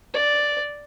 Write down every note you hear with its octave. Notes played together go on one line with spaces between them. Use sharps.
D5